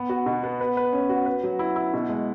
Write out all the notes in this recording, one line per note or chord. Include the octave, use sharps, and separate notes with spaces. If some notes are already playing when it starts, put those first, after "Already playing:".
Already playing: B3
F#4
B2
B3
B4
B4
C#4
F#4
B4
F#3
E4
E4
B2
G#3